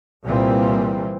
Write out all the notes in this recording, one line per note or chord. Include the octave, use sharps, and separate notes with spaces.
C2 A#2 E3 G3 A#3 C4